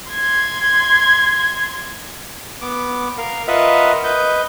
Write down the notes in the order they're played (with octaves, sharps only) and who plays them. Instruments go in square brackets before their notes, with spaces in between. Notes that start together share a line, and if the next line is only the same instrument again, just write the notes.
[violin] C6 G#6
[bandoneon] B3 D6
A#4 F5
F4 A#4 B4 D#5 E5 F#5
B4 D#5 G6